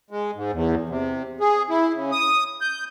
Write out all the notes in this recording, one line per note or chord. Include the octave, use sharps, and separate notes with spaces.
G#3
G#2
E2
C3
G#4
E4
C#3
D#6
G6